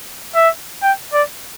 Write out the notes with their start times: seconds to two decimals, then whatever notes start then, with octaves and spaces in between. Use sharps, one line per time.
0.35 E5
0.82 G5
1.13 D5